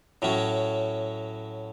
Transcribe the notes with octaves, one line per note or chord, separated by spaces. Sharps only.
A2 F#3 C#4